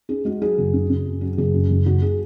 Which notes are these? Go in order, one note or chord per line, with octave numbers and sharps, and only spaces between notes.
C#4 G#4
G#3 F#4
F#3 G#4
F#1
C#3
C#3
F#2
F#3
F#1 G#4
F#2
F#1
F#1 F#4
G#4